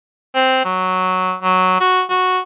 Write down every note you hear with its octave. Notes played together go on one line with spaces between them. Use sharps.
C4
F#3
F#3
F#4
F#4